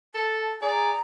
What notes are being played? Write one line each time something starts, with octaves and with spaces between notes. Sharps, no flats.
A4 A5
G#4 D5 A#5